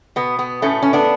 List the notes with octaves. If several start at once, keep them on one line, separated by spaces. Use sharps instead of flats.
B2 B3
B3
A2 A3 C#4
C#4
B3 D4